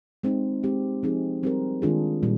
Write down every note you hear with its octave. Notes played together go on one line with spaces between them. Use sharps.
G#3 C4 D#4
G#3 C4 G4
F3 C4 D#4 G#4
G3 C4 G4 A#4
D#3 G#3 D4 F4 G#4
A#2 G3